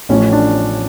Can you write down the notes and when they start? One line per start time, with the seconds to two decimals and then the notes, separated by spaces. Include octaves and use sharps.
0.09 A1 A2 F3 C#4
0.32 D4